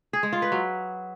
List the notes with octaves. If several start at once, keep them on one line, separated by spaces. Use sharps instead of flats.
G#4
G#3
F4
B4
F#3